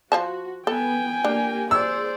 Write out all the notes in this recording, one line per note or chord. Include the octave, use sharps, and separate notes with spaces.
F3 F#4 C5 A5
B3 A4 G5 G#5
A#3 D4 G4
G#4 C5 D5 E6